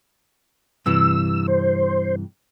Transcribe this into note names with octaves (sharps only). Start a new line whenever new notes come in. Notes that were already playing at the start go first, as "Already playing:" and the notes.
G2 C3 E3 E6
C5